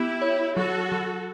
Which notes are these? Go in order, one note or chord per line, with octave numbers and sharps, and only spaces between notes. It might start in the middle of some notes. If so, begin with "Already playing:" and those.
Already playing: B3 E4 G4
C#5
F#3 F#4 A4
F#3